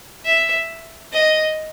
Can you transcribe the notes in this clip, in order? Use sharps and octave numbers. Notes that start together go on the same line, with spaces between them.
E5
D#5